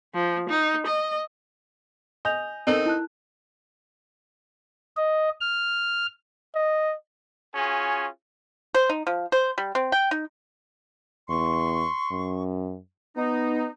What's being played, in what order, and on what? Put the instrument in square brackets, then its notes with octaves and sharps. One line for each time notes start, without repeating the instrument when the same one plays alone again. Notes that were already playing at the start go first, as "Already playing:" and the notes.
[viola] F3
D#4
D#5
[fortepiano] D#5 [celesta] G#5 G6 F7
[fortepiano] C4 A4 A#4 [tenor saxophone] D#4
[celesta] E4 A5 F#6
[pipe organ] D#5
F6
[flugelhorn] D#5
[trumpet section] C#4 F4 F#4 G#4 G#5
[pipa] C5
D#4
F3
C5
G3
C4
G5
D#4
[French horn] E2 [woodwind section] C6 C#6
[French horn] F#2
[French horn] B3 [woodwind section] D#4